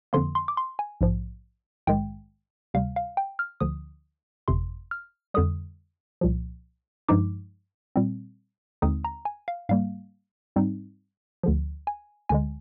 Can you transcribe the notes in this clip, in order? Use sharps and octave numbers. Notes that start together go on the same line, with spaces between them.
F2 D3 F3 A#3 C6
C6
D6
C6
G#5
A#1 G#2 F3
A#1 G#2 D#3 G#3 G5
D2 C3 G3 F5
F5
G5
F6
D2 D3 F3 D#6
G1 F2 C3 C6
F6
F2 D3 G3 D#6
C2 A#2 F3
G2 F3 G#3 D#4 D6
A#2 G3 C4
D#2 D3 G#3 C4 D#4 D#6
A#5
G#5
F5
G#2 G3 A#3 F5
G#2 G3 C4 D#4
D2 D3 F3
G#5
D2 D3 G#3 G#5